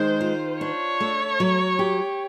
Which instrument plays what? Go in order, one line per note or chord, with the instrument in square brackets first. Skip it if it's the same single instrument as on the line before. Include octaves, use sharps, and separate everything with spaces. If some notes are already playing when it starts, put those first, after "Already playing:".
Already playing: [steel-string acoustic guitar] D#3 G#3 [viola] C5
[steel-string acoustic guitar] F4
[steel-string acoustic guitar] D4 [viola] C#5
[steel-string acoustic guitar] A3
F#3
G4